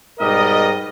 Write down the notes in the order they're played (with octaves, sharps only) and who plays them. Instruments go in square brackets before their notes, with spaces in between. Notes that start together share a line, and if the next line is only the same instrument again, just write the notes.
[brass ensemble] G#2 B2 G3 A#4 D#5